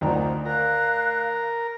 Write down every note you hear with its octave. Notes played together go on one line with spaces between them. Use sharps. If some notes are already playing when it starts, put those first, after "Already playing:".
D2 D#3 F4 C5 F#5 A#5
A#4 F5 F#6